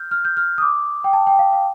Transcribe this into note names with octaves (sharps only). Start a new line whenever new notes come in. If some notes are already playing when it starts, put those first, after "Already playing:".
Already playing: F6 G6
F6
G6
F6
D#6
D6
G5
A5
G5
F5
F5